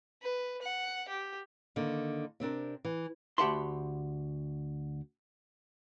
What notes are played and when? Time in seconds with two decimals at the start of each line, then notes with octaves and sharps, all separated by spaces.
0.22 B4
0.62 F#5
1.09 G4
1.76 D3 D#3 A#3
2.40 C3 C4 D4 A#4
2.85 E3
3.38 D2 G4 F#5 A5 B5 C6